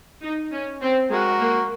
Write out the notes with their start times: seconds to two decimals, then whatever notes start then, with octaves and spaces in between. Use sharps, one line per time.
0.23 D#4
0.53 C#4
0.82 C4
1.11 G#3 F#4 A#4
1.40 A#3